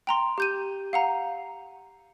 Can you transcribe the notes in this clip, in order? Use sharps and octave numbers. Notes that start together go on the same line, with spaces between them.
G5 A#5 C6
G4 G6 D#7
F5 F#5 A#5